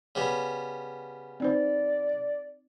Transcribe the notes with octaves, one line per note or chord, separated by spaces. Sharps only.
C#3 G3 B3
C4 D#4 C5 D5